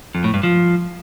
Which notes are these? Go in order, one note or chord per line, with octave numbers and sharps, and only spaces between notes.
F2
A2
G2
F3